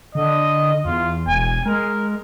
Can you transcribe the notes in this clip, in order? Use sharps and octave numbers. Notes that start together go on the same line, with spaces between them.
D3 D#5
E2 F4
E1 G#5
G#3 A#4